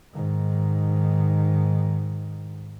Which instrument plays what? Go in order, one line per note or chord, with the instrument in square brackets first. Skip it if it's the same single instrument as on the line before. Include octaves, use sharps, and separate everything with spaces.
[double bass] G#2 D#3